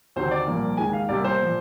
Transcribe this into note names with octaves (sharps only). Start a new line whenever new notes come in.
D2 C3 D#3 C5
D5
C2 A#2 F3 A#3
D#2 D#3 G#3 G#5
F5
C2 C3 G3 A#3 D5
C5
A#2 F3